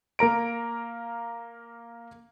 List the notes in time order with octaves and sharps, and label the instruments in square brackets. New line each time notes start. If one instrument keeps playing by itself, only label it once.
[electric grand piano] A#3 A#4 A#5 D7